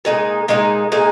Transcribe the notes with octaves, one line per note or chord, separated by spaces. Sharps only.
A#2 G#3 D#4 G#4
A#2 G#3 D#4 G#4
A#2 G#3 D#4 G#4